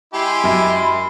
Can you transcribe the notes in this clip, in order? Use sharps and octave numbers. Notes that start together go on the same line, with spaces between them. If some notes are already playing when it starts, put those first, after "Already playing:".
G#3 E4 G4 G#5 C6
F#2 B5